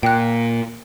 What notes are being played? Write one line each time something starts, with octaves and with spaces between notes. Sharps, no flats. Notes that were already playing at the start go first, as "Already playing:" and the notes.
A#2 G5 F#6